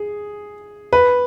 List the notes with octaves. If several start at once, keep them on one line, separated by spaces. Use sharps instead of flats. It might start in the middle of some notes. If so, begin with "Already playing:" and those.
Already playing: G#4
B4